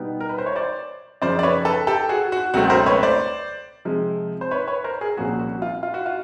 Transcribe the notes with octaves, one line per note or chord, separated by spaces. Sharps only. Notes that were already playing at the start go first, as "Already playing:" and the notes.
Already playing: B2 G3 B3 D#4
A#4
B4
C5
C#5
C5 D5
F#2 C#3 F3 C5 D5
D5
B4 C#5
A4 B4
G4 A4
F#4 G#4
F#4
C#2 B2 F#3 A3 C4 F#4
A#4 C5
B4 C#5
C5 D5
C3 F3 G#3
C5
B4 C#5
B4 C#5
A#4 C5
G#4 A#4
C2 A#2 F3 A#3 C#4 F#4 G#4
F#4
F4
F4
F#4
F4